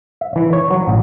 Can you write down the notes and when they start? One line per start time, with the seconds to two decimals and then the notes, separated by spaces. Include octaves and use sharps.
0.21 E5
0.36 E3
0.53 C#5
0.71 F#3
0.88 A1